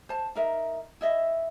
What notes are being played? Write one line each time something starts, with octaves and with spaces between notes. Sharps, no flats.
C5 A5
D#4 A#4 E5
E4 D#5 E5